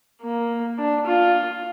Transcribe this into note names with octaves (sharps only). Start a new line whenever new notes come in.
A#3
D4
F4